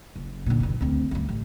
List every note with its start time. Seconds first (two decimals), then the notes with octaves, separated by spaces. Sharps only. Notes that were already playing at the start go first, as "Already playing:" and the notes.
0.16 F#1
0.46 A#2 D3
0.60 F#1 E3
0.81 D2 C4
1.11 D2 G2
1.29 A1